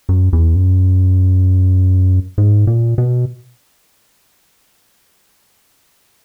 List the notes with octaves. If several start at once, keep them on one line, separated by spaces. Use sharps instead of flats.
F#2
E2
F#2
G#2
A#2
B2